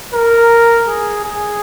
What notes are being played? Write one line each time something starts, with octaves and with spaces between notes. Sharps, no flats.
A#4
G#4
G#4